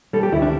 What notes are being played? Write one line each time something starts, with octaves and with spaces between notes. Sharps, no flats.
G3 A4
G4
D2 E4
D4